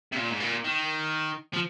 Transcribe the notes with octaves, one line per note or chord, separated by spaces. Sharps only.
C3
A#2
G#2
A#2
D#3
F3